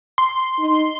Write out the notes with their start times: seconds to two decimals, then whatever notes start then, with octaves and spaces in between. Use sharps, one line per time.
0.18 C6
0.59 D#4